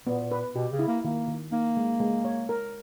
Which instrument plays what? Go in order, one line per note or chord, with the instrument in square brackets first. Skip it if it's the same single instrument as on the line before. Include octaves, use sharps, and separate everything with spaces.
[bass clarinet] A#2 [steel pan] B3
[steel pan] B4
[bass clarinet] B2 [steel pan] G4
[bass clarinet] C#3
[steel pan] E4
[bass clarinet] A#3
[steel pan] D#3 [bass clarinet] A#3
[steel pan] D#3
[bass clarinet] A#3 [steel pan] D#4
[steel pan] G#3
G#3
C#5
A#4